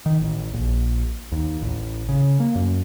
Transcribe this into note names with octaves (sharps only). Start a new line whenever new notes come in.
D#3
A1
A#1
D#2
A1
C#3
A#3
F#2